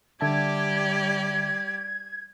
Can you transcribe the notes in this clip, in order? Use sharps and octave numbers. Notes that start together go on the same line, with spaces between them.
D3 G3 G4 D5 E5 A5 G#6